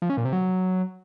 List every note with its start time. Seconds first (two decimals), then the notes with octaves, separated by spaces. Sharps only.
0.02 F3
0.10 C#4
0.17 A#2
0.25 C3
0.33 F#3